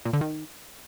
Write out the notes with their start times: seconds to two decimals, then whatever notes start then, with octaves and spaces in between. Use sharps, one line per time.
0.05 A#2
0.13 D3
0.21 D#3